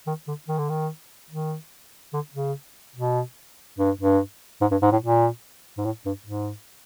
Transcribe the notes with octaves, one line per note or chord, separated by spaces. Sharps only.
D#3
D3
D#3
D3
D#3
D#3
D3
C#3
B2
G2
G2
G#2
G2
G#2
A2
A#2
G#2
A2
G2
G#2